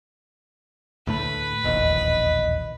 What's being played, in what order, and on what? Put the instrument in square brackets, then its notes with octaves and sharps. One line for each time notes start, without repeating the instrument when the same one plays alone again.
[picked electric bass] D2 A2 A3 [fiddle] B4
[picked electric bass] E1 A#1 D#2 [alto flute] D#5